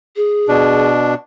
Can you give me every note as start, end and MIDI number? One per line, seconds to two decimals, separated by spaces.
0.16 0.90 68
0.48 1.14 47
0.48 1.14 62